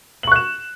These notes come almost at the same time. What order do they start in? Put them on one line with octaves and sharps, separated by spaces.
F#7 C#6 F#6 E7